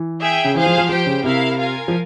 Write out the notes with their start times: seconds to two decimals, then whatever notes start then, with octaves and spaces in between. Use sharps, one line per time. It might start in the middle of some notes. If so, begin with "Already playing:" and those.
Already playing: E3
0.20 G#4 E5 G5
0.44 C#3
0.55 E3 G#4 C5 F5
0.66 F3
0.78 F3
0.89 F3 G4 C5 G5
1.06 C#3
1.24 C3 E4 A#4 F5
1.58 F4 A#4 F5 G#5
1.88 F3